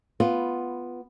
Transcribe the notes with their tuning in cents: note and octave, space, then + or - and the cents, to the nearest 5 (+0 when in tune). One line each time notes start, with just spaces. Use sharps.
B3 +0 F4 -5